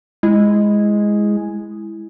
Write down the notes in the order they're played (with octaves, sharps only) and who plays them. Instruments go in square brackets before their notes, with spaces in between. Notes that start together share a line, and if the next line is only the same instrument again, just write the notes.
[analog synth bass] G#3 [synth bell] E4